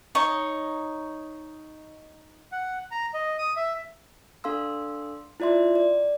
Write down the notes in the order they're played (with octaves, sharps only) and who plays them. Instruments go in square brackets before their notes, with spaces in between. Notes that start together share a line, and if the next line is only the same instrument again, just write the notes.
[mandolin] D#4 C#5
[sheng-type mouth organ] F#5
A#5
D#5
D#6
E5
[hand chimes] D4 A4 F5 C6 E6
E4 F4 D5 E5 C6
D5